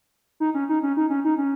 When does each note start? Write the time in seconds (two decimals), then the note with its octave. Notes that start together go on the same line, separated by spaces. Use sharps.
0.40 D#4
0.54 C#4
0.69 D#4
0.83 C#4
0.97 D#4
1.10 C#4
1.25 D#4
1.38 C#4